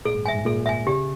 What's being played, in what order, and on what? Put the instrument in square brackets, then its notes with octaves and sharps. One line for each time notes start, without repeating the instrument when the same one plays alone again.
[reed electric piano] A#2 [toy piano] G#4
[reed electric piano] G#2
[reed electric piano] G2 [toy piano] E5 G#5
[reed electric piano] G#2
[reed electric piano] A#2 [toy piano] G#4
[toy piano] E5 G#5
[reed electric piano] C#3 [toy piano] G4